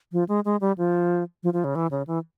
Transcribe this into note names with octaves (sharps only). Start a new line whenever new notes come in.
F3
G#3
G#3
G3
F3
F3
F3
C#3
E3
C#3
E3